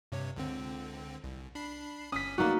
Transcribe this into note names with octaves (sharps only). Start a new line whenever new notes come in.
G2 C3 C#5
C#2 D3 C4
C2
D4 B5 C7
G1 C#4 D#6 B6
A3 A#3 D#4 F#4 D5